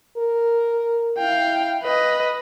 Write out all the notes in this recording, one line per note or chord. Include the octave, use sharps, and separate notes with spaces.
A#4
E4 F5 G5
B4 D#5